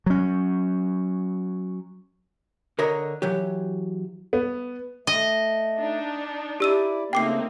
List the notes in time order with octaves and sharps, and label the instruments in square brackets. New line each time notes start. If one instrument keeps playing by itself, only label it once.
[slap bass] F#3 C#4
[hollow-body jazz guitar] D3 A#4 C#5 D#5 A#5
E3 F#3 G4
[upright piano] B3
[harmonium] A3 [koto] D#5
[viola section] D4 D#4
[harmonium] E4 D5 [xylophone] G4 E6 D#7
[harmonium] C#3 A3 [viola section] A#3 C4 D#4 [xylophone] G5 D6 C7